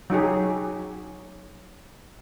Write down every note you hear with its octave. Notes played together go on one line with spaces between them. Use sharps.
F#3 D#4 G4 G#4